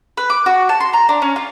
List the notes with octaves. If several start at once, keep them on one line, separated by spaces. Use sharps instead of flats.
B4
D6
F#4
A5
C6
A#5
D4
C#4
F4